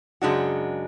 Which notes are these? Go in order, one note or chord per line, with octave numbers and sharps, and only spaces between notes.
F#2 C#3 G#3 D4 F#4